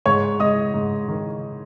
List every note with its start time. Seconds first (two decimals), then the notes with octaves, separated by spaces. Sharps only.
0.06 G#2 C#5 C#6
0.40 G#3 D#5 D#6
0.74 G#2
1.08 D#3